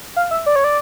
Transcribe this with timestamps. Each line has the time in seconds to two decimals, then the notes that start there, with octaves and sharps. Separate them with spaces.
0.16 F5
0.31 E5
0.46 D5
0.56 C#5
0.64 D5